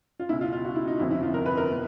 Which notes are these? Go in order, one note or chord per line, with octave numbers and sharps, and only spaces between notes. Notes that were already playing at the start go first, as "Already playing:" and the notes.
F4
C#2 B2 E4
F4
F4
F#4
E4
D#4
G1 F2 C3 E4
E4
F4
A#4
B4
A#4
B2